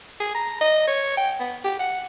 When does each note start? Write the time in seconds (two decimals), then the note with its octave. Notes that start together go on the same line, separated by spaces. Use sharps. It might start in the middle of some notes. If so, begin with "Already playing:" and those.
0.20 G#4
0.35 A#5
0.61 D#5
0.87 C#5
1.17 G5
1.40 B3
1.64 G4
1.79 F#5